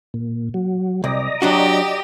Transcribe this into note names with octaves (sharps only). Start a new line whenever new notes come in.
A#2
F#3
C2 D5 D#5 A#5
F#3 D4 F#4 G4